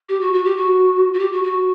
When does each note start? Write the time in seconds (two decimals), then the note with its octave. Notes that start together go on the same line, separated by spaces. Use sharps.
0.09 G4
0.21 F#4
0.33 F#4
0.45 G4
0.57 F#4
1.14 F#4
1.19 G4
1.33 F#4
1.44 F#4